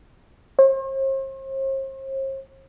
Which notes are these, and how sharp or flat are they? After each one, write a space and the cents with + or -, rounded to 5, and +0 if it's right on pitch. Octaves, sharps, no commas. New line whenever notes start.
C5 +45